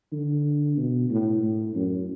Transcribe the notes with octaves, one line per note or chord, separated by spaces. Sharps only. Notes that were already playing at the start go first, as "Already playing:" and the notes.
D3
B2
A2
A2
F#2